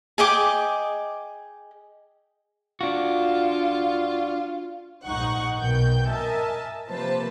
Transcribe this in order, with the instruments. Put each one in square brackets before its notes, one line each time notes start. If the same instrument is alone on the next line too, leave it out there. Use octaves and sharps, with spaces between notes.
[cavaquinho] G#4 D#5 G5 D6
[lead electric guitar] D4 F#4 [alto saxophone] F4
[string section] A#1 G#2 D#4 F#5 C#6
B1 B2 D#3 G5 G6
A#4 D#5 E5 G#5 A5
C3 F3 A#3 B4 C5 A5